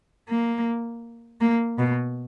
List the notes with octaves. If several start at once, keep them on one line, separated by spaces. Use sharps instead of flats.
A#3
A#3
B2